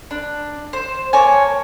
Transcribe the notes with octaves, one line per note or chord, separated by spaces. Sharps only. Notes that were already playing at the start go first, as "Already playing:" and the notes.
D4
C5
A#3 C#5 G#5 A5